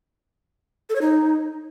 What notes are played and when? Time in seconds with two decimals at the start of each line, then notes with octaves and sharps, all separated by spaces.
0.89 A4
0.95 C#5
1.01 D#4